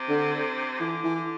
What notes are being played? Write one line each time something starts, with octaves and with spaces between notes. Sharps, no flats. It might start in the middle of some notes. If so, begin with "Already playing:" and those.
Already playing: C3
D3
D3 E3
E3
D3